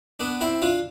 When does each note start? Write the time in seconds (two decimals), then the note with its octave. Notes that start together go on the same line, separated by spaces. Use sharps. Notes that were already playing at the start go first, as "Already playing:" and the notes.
0.20 B3 D4
0.41 C4 E4
0.62 D4 F4